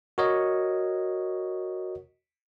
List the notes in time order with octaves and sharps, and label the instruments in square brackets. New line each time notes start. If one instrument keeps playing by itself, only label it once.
[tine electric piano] F#4 A#4 C#5 D#5